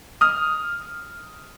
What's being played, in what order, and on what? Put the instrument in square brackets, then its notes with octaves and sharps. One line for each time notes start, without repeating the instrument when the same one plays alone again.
[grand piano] D#6 F6